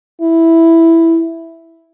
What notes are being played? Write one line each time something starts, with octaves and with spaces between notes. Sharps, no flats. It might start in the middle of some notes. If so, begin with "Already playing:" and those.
E4